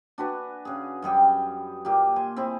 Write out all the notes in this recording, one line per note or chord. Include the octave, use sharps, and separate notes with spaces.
D4 F#4 B4 G#5
C#3 G#4
F#2 G3 G#4 G5
A#2 A#3 G4
G#5 C6
C4 E4 G#4